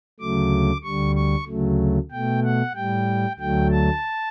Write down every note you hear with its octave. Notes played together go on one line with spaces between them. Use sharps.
D2 C#3 F#3 A3 D6
D2 D3 G3 C#6
C#6
D2 C#3 F#3 A3
B2 A3 G5
F#5
A2 G3 G5
D2 D3 F#3 A3 G5
A5